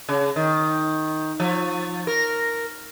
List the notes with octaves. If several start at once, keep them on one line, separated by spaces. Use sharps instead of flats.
C#3
D#3
F3
A#4